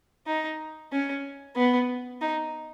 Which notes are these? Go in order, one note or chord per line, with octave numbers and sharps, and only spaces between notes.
D#4
C#4
B3
D#4